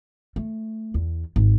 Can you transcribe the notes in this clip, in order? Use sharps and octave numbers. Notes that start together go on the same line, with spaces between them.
A3
E2
G#1